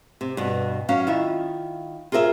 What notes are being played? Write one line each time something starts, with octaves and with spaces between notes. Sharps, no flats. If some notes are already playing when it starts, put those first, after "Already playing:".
C3
G2 B2
F#3 C#4 F5
D#3 E4 F4
F4 G#4 A#4 D5 E5